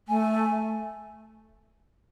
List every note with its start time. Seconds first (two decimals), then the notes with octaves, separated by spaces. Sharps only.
0.08 A3 G#5